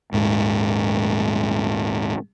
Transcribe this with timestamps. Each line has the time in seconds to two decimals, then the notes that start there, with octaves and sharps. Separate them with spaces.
0.12 D#1 G#2